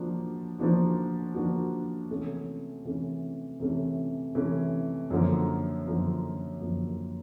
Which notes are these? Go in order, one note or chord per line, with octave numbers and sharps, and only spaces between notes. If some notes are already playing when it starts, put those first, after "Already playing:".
Already playing: F3 A#3 D4 F#4
F3 A#3 D4 F#4
F3 A#3 D4 F#4
C3 E3 A3 C#4
C3 E3 A3 C#4
C3 E3 A3 C#4
C3 E3 A3 C#4
F#2 D3 F3 A#3
F#2 D3 F3 A#3
F#2 D3 F3 A#3